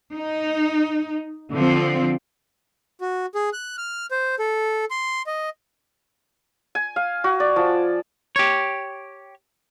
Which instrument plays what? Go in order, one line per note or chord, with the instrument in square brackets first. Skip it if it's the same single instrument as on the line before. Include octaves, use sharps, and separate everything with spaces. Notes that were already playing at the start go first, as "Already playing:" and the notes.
[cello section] D#4
D3 F3 C4
[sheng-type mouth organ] F#4
G#4
F#6
F6
C5
A4
C6
D#5
[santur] G#5
F5
F#4
D5
F3
[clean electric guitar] G4 C#5